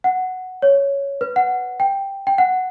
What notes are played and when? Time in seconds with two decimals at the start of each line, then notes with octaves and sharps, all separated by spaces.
0.04 F#5
0.62 C#5
1.21 B4
1.36 F#5
1.80 G5
2.27 G5
2.38 F#5